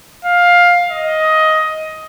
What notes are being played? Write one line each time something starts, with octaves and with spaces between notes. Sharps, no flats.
F5
D#5